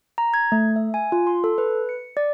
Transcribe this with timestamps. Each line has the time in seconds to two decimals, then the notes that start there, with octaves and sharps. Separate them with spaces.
0.18 A#5
0.34 G#6
0.52 A3
0.76 E5
0.94 G#5
1.12 F4
1.27 C6
1.44 A4
1.58 B4
1.89 C#7
2.17 D5